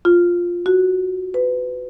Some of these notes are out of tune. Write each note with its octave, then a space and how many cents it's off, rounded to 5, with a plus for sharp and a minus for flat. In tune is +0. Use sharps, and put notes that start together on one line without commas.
F4 +5
F#4 +0
B4 +25